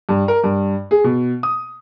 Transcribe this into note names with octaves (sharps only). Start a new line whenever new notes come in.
G2
A#4
G2
G#4
B2
D#6